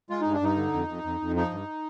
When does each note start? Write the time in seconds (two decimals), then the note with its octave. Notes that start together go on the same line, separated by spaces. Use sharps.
0.10 G#3 F4
0.21 G2 D#4
0.33 D4
0.41 G2 D#4
0.56 D3
0.73 F2
0.88 F2
1.04 F2
1.20 F2
1.36 F3 D#4
1.51 G2